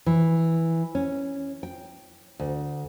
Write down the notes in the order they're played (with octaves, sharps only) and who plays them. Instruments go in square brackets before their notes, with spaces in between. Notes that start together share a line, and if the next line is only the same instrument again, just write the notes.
[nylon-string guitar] E3
C#4
G5
D2